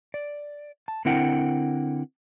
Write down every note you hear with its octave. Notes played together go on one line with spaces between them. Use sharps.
D5
A5
D3 C4 E4 A#4 F#5 G5